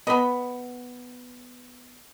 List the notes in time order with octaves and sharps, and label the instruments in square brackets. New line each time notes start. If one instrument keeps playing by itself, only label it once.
[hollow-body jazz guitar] B3 [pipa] D#5 B5